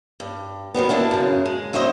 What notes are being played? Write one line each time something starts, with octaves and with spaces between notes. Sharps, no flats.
G2
D#3 F#3 G3 B3
A#3 D4 E4 A5
F#2 C#3
G#3
F#3 E4 F#4 C5 D#5